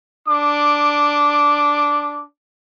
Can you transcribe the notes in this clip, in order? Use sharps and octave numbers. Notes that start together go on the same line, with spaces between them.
D4 D6